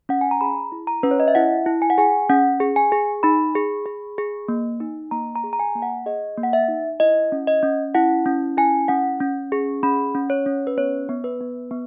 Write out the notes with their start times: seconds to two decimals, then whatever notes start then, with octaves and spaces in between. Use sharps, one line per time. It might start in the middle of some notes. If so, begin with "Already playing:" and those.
0.09 C#4 F#5
0.21 G#5
0.31 A#5
0.41 G#4 B5
0.72 E4
0.87 A#5
1.03 C#4 B4
1.11 C#5
1.20 D#5
1.28 E5
1.35 E4 F#5
1.66 E4
1.82 G#5
1.90 F#5
1.98 G#4 G#5
2.29 C#4 F#5
2.60 G#4
2.76 G#5
2.92 G#4
3.23 D#4 B5
3.55 G#4
3.86 G#4
4.18 G#4
4.48 A#3
4.80 D#4
5.11 A#3 A#5
5.36 A#5
5.44 G#4
5.53 A#5
5.59 G#5
5.75 A#3
5.82 F#5
6.06 G#4 D#5
6.38 A#3
6.43 F#5
6.53 E5
6.68 D#4
7.00 E4 D#5
7.32 C#4
7.47 D#5
7.63 C#4
7.95 E4 F#5
8.26 C#4
8.57 E4 G#5
8.88 C#4 F#5
9.20 C#4
9.52 G#4
9.83 C#4 B5
10.15 C#4
10.30 C#5
10.46 C#4
10.67 B4
10.77 B3 C#5
11.09 B3
11.24 B4
11.41 B3
11.71 B3